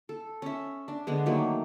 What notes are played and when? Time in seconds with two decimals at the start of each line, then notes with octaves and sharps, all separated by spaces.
0.09 A4
0.42 C#4 E5
0.88 D4
1.07 D3 G#3 B3
1.26 D#3 F#3 A3 A#3